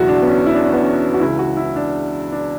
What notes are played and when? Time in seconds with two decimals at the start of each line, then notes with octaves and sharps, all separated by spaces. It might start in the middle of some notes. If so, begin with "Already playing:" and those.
Already playing: F#1 E2 B2 F#3 E4 F#4
0.08 D4
0.22 B3
0.28 C#4
0.46 E4
0.55 D4
0.65 C#4
0.73 B3
0.82 C#4
1.14 F#4
1.20 C#2 C#3 E3 E4
1.39 F#4
1.57 E4
1.76 D4
2.32 D4